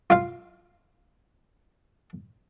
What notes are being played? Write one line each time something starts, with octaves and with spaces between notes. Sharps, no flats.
F4 F5